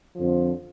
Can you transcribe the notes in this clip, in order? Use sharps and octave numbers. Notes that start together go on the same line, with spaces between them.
F2 D3 F3